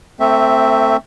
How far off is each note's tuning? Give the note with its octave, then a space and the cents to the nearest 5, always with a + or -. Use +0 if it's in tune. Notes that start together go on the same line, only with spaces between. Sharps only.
A3 +25 C4 +0 E5 +0